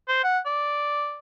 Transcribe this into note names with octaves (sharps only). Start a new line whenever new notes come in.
C5
F#5
D5